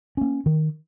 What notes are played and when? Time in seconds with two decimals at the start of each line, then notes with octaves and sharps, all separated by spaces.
0.17 A#3 C#4
0.46 D#3